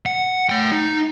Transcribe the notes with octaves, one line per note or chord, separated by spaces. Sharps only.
F#5
A3 G5
D#4